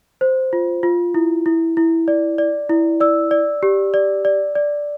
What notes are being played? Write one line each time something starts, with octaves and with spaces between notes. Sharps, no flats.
C5
F4
F4
E4
E4
E4
D5
D5
E4
D5 E6
D5
G4
D5
D5
D5